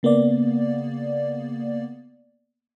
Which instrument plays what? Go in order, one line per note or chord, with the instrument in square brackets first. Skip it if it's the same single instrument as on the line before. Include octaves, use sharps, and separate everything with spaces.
[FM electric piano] C#3 A#3 B3 D5